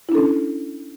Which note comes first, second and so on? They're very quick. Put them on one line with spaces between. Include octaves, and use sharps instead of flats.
E4 D4 A4 C#4